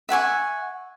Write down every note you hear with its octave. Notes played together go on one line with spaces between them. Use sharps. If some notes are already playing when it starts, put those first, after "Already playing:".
E5 F#5 G#5 C#6